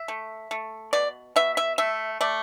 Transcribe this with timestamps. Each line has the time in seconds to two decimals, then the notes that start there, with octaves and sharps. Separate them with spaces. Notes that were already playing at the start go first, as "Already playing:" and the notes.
Already playing: E5
0.08 A3
0.51 A3
0.93 B2 D5
1.36 B2 E5
1.57 E5
1.78 A3 E5
2.21 A3 D5